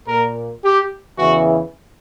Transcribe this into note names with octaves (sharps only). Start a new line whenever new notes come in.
A#2 A#4
G4
E2 C#3 E3 F#4